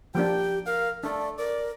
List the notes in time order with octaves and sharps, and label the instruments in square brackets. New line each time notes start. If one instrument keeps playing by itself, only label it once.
[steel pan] F3 A#3 D4 [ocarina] G4 [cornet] G5
[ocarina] A#4 [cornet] F5
[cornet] A3 [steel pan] D4 A4 [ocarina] D5
[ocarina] A#4 [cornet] D5